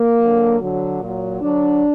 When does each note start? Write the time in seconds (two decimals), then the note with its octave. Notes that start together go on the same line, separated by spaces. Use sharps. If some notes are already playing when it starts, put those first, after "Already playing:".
Already playing: A#3
0.19 D3 F#3
0.60 D3 F#3
1.01 A#2 F#3
1.41 D3 F#3 D4